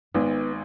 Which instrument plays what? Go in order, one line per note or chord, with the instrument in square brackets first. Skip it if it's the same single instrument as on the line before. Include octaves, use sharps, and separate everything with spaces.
[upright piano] G#1 G#2 [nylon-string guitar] B3